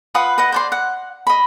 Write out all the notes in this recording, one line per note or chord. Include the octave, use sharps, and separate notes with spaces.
F4 B4 F#5 D#6
B4 D#5 F#5
C5 D5 C6
F#5
D#5 B5